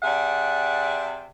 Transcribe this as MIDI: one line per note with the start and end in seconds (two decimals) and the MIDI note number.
0.03 1.27 48
0.03 1.27 68
0.03 1.27 74
0.03 1.27 76
0.03 1.27 78